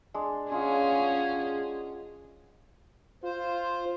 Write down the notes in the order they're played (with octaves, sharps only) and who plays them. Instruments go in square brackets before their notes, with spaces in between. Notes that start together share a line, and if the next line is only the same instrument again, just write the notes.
[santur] G#3 D4
[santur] G#3 F4 F#5 [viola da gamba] C#4 G#4
[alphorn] F4 [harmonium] C5